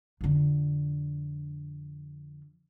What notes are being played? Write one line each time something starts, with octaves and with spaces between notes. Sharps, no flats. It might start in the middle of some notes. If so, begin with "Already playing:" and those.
F2 D3